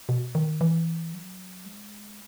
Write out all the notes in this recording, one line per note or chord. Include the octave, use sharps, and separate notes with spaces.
B2
D#3
E3
F#3
G#3